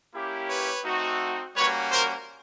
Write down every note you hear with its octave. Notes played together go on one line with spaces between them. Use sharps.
A#3 C#4 E4 G4
B4 C#5
A3 C4 D#4 F#4
G3 A#3 C#4 F#4 B4 C#5
A#4 C5